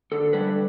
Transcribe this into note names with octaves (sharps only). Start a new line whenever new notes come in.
D3 A4
G3 B4